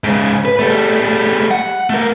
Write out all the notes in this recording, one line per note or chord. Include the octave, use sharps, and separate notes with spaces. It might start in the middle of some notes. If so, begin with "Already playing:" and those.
G#2 C#3
B4
G3 A3
F#5
A3 A#4